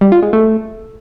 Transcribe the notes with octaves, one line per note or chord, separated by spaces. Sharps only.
G3
F4
G#3
A3